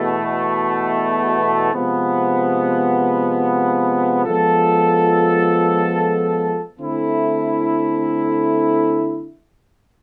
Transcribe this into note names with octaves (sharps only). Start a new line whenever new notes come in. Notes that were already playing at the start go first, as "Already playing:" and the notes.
Already playing: E2 B2 A3
C3 F3 G#3 B3
F3 G#3 B3 F4 A4
D3 A3 C4 E4